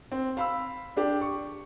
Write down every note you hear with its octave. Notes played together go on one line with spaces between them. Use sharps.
C4
F5 B5 E6
D4 G4
C#6